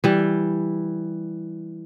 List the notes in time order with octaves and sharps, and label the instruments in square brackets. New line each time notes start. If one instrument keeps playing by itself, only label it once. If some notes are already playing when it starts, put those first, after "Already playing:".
[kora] E3 G3